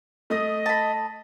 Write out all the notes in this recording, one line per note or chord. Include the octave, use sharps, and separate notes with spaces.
A3 D#5 D#6
A5 B5